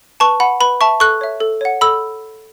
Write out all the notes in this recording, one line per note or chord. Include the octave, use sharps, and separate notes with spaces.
B4 A5 C#6
F#5 B5
B4 B5
E5 A5 C#6
A4 C#6 F#6
C#5 E5
A4
C#5 F#5
A4 B5 E6